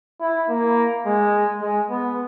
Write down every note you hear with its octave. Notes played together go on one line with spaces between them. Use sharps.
E4
A#3
G#3
G#3
B3